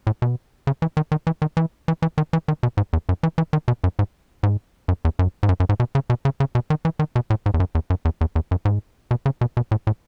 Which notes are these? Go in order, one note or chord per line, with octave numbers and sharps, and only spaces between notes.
A2
B2
C#3
E3
D#3
D#3
E3
D#3
E3
E3
E3
D#3
E3
D#3
B2
G#2
E2
F#2
E3
E3
D#3
B2
F#2
G#2
G#2
F#2
E2
F#2
G#2
F#2
F#2
G#2
B2
C#3
B2
C#3
C#3
B2
D#3
E3
D#3
B2
A2
G#2
E2
F#2
E2
F#2
E2
E2
E2
F#2
G#2
B2
C#3
B2
B2
A2
A2